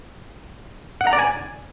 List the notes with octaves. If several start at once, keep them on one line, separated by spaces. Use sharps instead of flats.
F#5
A#5
D5
G#5